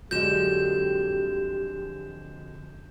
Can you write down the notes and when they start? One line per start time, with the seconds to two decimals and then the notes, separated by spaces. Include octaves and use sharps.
0.11 F2 D3 F#3 G#3 G4 G6 E7